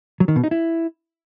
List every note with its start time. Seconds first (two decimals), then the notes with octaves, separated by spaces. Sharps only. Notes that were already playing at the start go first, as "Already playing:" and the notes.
0.20 F#3
0.28 D#3
0.36 B2
0.44 D#4
0.51 E4